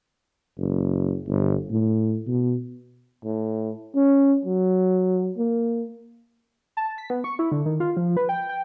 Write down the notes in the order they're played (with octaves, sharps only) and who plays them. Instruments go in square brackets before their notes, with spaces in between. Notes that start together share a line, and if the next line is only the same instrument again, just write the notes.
[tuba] F#1
G1
A2
B2
[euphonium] A2
C#4
F#3
A#3
[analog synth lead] A5
B6
B3
C#6
E4
D3
D#3
F4
F3
B4
G5
G5